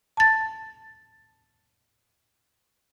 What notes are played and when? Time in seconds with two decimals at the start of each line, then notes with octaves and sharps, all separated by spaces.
0.17 A5 A6